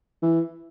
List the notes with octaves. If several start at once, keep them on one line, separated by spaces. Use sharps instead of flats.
E3